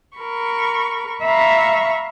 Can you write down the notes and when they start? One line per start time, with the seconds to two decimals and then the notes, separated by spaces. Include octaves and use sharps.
0.17 A#4 B5 C#6
1.22 E5 F5 A#5 B5 C#6